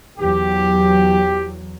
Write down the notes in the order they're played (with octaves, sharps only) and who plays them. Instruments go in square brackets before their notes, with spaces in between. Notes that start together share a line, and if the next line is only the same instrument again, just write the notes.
[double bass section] E2 F#3 [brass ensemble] G4